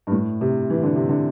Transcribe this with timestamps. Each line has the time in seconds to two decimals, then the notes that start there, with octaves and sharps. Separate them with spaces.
0.07 G2
0.12 A2
0.41 C3
0.70 E3
0.83 D3
0.96 C3
1.09 D3